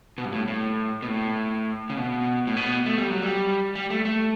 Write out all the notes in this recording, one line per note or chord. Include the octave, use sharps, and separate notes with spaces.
B2
G2
A2
A2
B2
A2
C#3
B2
A2
B2
A3
G3
F#3
G3
G3
A3
A3